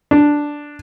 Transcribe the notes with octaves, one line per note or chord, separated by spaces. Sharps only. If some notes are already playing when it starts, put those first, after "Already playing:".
D4